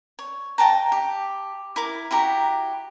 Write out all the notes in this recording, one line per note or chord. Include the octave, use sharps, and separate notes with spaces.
C#5
D#5 G5 A5 A#5
G4
E4 A#4 D6
E4 F#4 G4 A#5